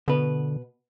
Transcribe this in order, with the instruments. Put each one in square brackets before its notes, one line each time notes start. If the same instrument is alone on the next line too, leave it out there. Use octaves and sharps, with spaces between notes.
[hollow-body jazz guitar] B2 B4 [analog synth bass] D3